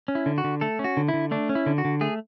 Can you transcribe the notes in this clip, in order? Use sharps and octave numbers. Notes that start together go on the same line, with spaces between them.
C#4
E4
D3
F#4
D3
A3 A4
C#4
F#4
D3
E4
D3
A3 D4
C#4
E4
D3
F#4
D3
A3 G#4